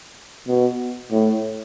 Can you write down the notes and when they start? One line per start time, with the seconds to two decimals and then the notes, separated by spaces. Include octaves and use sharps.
0.48 B2
1.11 A2